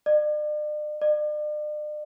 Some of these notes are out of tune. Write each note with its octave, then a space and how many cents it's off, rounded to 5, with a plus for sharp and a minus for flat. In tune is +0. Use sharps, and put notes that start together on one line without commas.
D5 +40
D5 +40